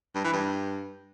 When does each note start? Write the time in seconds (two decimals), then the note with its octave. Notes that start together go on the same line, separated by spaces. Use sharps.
0.15 G2
0.24 E3
0.33 G2